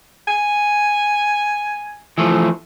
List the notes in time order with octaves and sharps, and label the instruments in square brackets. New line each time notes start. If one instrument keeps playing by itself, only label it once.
[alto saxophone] G#5
[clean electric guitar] E3 F3 A3